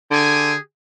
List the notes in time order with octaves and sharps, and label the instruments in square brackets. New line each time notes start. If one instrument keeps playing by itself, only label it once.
[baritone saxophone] D3 [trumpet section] G4 G#4 G#5